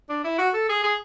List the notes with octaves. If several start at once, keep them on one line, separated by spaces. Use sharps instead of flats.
D4
E4
F#4
A4
G#4
G#4